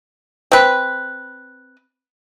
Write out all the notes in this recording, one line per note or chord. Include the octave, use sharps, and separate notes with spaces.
C4 B4